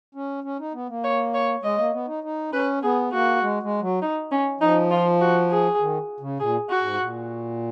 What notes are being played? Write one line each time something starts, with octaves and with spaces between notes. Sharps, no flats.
C#4
C#4
D#4
B3
A#3
C#5
C#5
G#3 D#5
A#3
B3
D#4
D#4
C#4 B4
B3 G#4
A#3 F#4
G#3
G#3
F#3
D#4
C#4
F3 D#4
F4
F#4
G#4
D#3
C#3
A#2 G#4
F#4
G#2
A#2